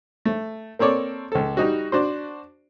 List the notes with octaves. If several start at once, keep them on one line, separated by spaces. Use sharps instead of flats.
A3
A#3 C4 A4 C#5 D5
C#2 A4
G3 D#4 F#4
D4 F#4 C5